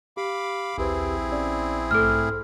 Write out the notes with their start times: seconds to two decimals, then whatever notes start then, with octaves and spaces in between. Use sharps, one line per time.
0.17 G4 F5 B5 D6
0.78 A#1 D#2 C4 E4 G4 G#4 B4
1.32 C#4 D5
1.91 B1 G#2 A3 A4 F6